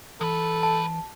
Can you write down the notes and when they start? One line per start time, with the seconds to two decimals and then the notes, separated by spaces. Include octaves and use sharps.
0.21 E3 G#3 A4 B4
0.63 A5